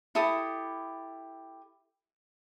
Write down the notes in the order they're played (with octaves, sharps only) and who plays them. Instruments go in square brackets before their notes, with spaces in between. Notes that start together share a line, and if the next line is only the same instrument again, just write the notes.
[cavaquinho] E4 G4 A4 D#6